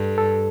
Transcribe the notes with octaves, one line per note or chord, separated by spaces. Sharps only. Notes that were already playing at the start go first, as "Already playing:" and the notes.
Already playing: G2 A4
A4